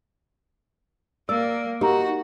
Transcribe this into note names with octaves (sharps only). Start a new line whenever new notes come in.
A#3 D5 E6
D#4 F#4 G4 A#4 A#5